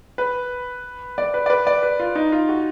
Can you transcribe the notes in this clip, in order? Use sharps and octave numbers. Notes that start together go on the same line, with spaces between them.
B4
D5
B4
D5
B4
D5
B4
F4
D#4
F4
F#4